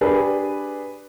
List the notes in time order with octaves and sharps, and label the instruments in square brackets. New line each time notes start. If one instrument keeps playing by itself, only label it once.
[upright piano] D4 G4 G#4 B4